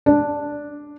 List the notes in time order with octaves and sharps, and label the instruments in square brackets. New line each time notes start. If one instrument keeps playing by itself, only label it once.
[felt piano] D4